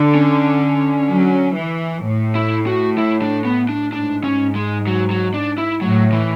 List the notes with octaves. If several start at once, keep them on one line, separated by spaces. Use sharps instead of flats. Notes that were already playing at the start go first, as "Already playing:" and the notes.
Already playing: D3
C#4
F#3
E3
A2
E4
F#4
E4
D4
B3
D4
G#2 D4
C#4
G#3
F#3
F#3
D4
E4
A2 F#3
E3